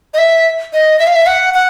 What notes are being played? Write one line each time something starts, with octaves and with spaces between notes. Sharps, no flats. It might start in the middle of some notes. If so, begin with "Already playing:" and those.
D#5
E5
D#5
E5
F5
E5
F#5
F#5